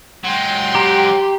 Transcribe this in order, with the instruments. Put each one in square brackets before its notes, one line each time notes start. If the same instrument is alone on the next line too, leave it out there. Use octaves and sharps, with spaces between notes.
[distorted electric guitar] F#3 G#3 [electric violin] G5 C6
[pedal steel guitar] G4 [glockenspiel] A#5